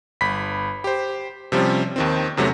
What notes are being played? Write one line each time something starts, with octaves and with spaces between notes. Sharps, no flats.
G1 B5 B6
G4 C5
C3 F3 G3 C4 C#4
D#2 D#3 C4
E2 C3 F#3 A3 C#4